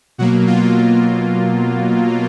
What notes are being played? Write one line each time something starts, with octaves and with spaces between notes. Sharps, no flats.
B2 F#3 A#3 F#4
F4